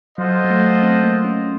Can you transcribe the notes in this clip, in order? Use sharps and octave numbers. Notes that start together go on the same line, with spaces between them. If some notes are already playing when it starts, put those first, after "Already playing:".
F#3 F4 A4 C5 D#5 F#5
F#3
A3
C4
A#3
C#4